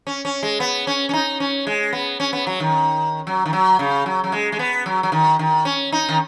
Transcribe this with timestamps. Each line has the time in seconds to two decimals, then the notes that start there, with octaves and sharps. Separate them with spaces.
0.07 C#4
0.25 C#4
0.43 G#3
0.60 B3
0.87 C#4
1.09 C#4
1.13 D#4
1.40 C#4
1.67 G#3
1.93 B3
2.20 C#4
2.33 B3
2.47 F#3
2.60 D#3
3.27 F#3
3.46 D#3
3.53 F#3
3.79 C#3
4.06 F#3
4.24 F#3
4.32 G#3
4.52 G#3
4.59 B3
4.86 F#3
5.03 F#3
5.12 D#3
5.39 D#3
5.65 C#4
5.92 D#4
6.09 D#3